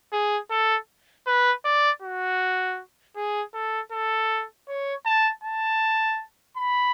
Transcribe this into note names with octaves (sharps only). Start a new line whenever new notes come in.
G#4
A4
B4
D5
F#4
G#4
A4
A4
C#5
A5
A5
B5